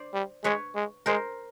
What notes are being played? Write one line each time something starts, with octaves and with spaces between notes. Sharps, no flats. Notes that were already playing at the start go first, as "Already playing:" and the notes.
Already playing: C5 D5
G3
G#3 B4 C#5
G#3
G#3 A#4 C5